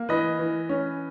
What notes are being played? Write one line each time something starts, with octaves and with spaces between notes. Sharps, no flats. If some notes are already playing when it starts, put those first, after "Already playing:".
Already playing: A#3
E3 B4 D#5
E3
C#4